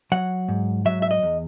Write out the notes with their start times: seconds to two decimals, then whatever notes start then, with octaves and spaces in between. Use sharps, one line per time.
0.12 F#3 F#5
0.48 G#2
0.85 F#3 E5
1.02 E5
1.11 D#5
1.23 E2